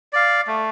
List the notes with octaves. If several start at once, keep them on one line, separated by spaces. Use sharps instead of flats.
D5 F5
A3